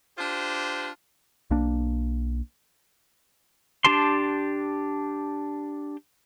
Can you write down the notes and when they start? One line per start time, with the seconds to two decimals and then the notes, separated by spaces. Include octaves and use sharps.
0.18 D4 F4 G4 C5
1.51 B1 A#3 D4
3.85 D4 G4 A5 C6